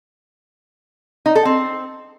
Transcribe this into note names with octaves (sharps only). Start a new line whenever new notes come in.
D#4
A4
C4